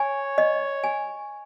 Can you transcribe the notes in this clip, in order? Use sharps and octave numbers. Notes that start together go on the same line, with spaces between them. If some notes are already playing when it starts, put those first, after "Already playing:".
Already playing: C#5 G#5
D#5
G#5